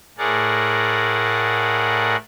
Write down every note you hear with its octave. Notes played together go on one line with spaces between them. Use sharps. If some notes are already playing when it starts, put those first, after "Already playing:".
A2 G#4 A#4 D5 F#5